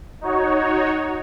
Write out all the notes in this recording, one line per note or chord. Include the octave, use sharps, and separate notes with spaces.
D#4 F#4 C#5